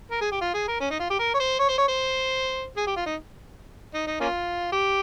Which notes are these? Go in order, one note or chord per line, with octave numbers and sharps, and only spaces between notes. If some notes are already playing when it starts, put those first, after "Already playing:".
A#4
G#4
G4
F4
G#4
A#4
C#4
D#4
F4
G4
A#4
C#5
C5
C#5
C5
C#5
C5
G#4
G4
F4
D#4
D#4
D#4
A#3 C#4 F4
G4